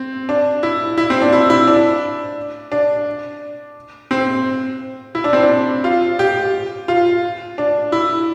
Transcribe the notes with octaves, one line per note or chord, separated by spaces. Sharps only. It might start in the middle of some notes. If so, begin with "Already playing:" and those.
Already playing: C4
D4
E4
E4
C4
D4
E4
E4
D4
D4
C4
E4
D4
C4
D4
F4
G4
F4
D4
E4